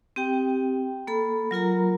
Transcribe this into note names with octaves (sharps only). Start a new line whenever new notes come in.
C4 G4 G5
A#3 A4 B5
F#3 F4 A#4 A#5